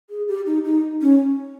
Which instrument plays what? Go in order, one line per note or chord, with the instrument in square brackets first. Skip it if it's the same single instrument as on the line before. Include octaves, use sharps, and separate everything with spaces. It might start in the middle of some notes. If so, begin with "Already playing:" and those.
[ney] G#4
G4
D#4
D#4
C#4